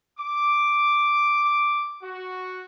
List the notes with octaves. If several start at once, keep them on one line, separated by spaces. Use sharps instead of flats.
D6
F#4